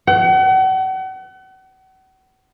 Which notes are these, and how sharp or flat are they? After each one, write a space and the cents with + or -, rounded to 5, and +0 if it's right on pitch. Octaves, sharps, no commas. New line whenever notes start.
F#5 +40